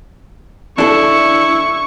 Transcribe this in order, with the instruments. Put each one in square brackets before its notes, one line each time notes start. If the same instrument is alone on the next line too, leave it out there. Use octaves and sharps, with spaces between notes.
[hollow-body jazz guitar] D4 A4 [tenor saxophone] E4 [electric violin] C#6